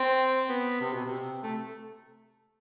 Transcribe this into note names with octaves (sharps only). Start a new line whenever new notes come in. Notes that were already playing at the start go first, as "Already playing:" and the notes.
Already playing: C4
B3
C3
B2
C3
A3